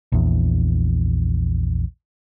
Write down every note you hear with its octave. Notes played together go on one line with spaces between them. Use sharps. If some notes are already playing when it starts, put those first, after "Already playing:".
A#1 E2